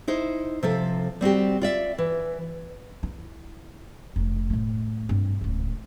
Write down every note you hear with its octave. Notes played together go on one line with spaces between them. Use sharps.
D#4 E4 C5
C3 F3 A4
G3 C4 F#4 G4
F4 D5 E5
E3
E4
F1
A2 A3
G2 C4
D1 C#2